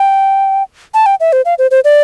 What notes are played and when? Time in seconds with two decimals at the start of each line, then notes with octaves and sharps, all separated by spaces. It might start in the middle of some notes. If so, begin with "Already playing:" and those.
Already playing: G5
0.94 A5
1.06 G5
1.20 E5
1.33 C5
1.45 F5
1.58 C5
1.71 C5
1.84 D5